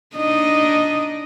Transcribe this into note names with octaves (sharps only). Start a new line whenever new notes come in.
D4 D#4 D#5